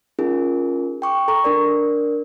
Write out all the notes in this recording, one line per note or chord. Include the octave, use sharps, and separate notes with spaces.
C#4 D#4 F4 G#4 A#4
G5 C#6 D6
A4 A#5 C#6
D4 A#4 D5